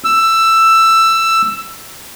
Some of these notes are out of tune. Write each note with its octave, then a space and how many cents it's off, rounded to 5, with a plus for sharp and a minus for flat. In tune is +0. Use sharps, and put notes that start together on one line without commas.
E6 +10